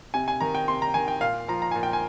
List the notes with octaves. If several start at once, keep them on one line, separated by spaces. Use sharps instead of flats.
C3 G#5
G#5
D#3 A#5
G5
C3 C6
A#5
D#3 G#5
G5
A#2 F5
F3 A#5
A#5
A#2 G#5
G5
G#5